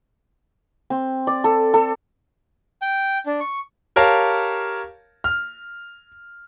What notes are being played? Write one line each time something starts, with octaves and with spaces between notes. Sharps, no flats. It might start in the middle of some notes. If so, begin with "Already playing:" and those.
C4
D5
A4
A4
G5
D4
C#6
G4 A#4 C#5 F5 A5
F6